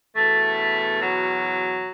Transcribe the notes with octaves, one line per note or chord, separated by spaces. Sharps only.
E2 B2 A3
F#3